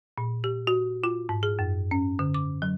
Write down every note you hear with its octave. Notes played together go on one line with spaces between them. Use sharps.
A#2
G4
F#4
F4
G#2
G#4
F#2
C#4
D3
D6
F#3